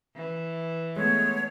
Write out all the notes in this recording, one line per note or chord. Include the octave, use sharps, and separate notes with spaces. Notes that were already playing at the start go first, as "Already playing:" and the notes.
E3
G#3 A3 B3 C#5